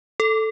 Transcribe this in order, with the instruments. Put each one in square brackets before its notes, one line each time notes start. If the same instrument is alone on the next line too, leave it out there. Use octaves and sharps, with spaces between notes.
[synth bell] A4